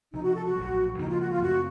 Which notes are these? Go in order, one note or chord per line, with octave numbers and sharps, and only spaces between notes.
C#2 C3 F3 D#4
F#4
A4
F#4
A#1 A2 F#3
C#2 C#3 F3 A#3 D#4
F4
F#4
F4
F#2 C#3 A3 C4 F#4